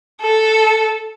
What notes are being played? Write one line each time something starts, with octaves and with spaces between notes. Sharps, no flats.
A4